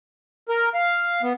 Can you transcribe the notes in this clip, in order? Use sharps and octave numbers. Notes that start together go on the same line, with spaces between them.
A#4
F5
B3